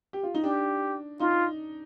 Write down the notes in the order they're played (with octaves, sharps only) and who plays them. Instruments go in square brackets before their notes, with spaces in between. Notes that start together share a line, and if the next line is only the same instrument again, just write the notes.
[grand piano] G4
F4
D#4
[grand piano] D4 [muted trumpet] G4
[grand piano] D#4 [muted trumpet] F4